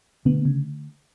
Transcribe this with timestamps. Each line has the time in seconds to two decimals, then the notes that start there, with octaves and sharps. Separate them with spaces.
0.25 B2 D3 A3 B3 D4
0.45 C#3